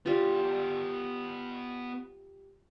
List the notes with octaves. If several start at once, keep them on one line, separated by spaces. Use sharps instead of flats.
G3 B3 F4 D5